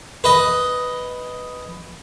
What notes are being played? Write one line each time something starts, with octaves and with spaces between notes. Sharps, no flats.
B4 D#5